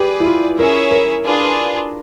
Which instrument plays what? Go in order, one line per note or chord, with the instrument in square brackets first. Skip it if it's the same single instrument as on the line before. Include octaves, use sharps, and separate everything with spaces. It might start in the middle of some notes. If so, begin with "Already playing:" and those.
Already playing: [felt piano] G4 [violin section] G#4 B4 D5
[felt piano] E4
F4
[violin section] C#4 E4 G#4 C#5 E5 [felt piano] A#4
[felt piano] A#4
[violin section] D4 F4 G#4 B4